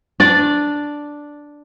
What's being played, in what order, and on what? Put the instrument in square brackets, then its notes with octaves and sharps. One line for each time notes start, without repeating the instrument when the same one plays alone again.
[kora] D4 D5